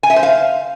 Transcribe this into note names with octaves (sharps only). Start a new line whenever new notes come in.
G#5
E5
C5
F5